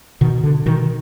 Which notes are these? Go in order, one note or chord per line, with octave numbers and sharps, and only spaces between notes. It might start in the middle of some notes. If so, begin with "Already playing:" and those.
B2 D#3
D3
B2 D#3